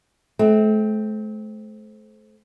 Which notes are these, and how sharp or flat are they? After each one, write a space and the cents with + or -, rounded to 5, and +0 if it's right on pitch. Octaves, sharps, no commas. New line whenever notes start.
A3 -40 C4 +0